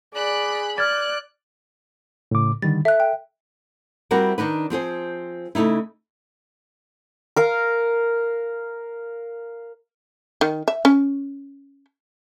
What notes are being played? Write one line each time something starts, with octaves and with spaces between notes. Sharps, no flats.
G#4 D5 B5 F#6
D5 F6 F#6 G#6 A6
A2 C#3 D6
D3 D#3 G3 A6
A4 E5 F#6
G5
G3 C4 E4 F#4 A#4
D#3 D4 D#4 B4
F3 C4 G#4 C5
C#3 A3 D#4 E4
A#4 F5 A#5
D#3
E5
C#4